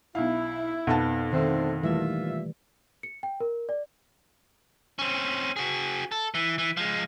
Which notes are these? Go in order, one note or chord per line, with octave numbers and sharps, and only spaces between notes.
B1 E4 F5
F2 B2 B3 D#4 F#5 A5
D3 D#3 A3 C4
A#2 E3 G3 A3 F4 E5
C#7
G5
A#4
D5
C4 C#4
F#4 G#4
A4
E3
E3
F3 G#3